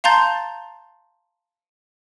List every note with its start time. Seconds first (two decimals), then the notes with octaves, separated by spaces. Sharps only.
0.04 F5 A5 A#5 C6 G6 A6